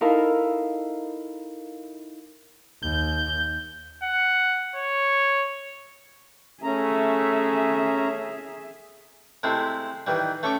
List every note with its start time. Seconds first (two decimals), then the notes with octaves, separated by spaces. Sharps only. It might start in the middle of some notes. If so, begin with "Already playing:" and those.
0.01 D#4 E4 A4 A#4 F5
2.83 D#2 G6
4.03 F#5
4.76 C#5
6.64 A3 C#4 G#4 E5 A#5
9.43 C3 G#3 A3 E4
10.07 D#3 E3 G3
10.43 A3 C#4 A4 C#6 D6